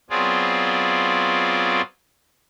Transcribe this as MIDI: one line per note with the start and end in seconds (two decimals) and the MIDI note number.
0.10 1.82 54
0.10 1.82 59
0.10 1.82 60
0.10 1.82 65
0.10 1.82 68
0.10 1.82 74